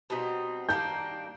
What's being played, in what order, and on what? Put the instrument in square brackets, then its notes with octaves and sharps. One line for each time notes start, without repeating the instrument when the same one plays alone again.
[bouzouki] B2 G3 C4 D#4
[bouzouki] D#3 G3 A#3 D4 [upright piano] G6